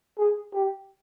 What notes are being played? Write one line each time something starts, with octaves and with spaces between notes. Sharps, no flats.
G#4
G4